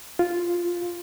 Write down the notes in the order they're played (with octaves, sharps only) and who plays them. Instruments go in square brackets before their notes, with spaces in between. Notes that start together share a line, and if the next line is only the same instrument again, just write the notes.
[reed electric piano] F4